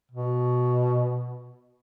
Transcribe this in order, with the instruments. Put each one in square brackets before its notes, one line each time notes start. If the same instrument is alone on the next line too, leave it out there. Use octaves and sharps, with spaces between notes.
[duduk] B2